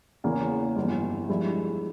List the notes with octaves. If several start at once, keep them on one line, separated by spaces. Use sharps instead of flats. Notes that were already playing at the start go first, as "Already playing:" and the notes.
E2 C#3 E3 A#3
G1 F2 E3
G2 F3 G#3 E4